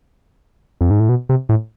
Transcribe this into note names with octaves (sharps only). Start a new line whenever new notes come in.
F2
G#2
A2
B2
C3
A2